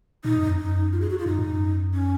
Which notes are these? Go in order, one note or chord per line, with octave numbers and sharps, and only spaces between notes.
A#2 D#4
F#2
F2
F#2 D#4
F4
G#4
F#4
F4
F#2 D#4
G#2
F#2
C#4